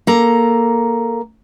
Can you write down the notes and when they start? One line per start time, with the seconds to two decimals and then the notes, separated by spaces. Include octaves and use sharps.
0.07 A#3 A4 A#5